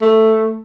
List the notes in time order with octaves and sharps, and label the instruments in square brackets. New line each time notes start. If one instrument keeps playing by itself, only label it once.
[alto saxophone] A3